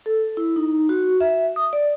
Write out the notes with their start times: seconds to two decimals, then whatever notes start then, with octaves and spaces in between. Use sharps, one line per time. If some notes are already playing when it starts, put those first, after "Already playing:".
0.06 A4
0.37 E4
0.56 D#4
0.89 F#4
1.20 E5
1.56 D#6
1.73 D5